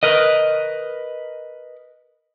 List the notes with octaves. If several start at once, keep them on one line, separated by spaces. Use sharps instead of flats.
A#4 B4 D#5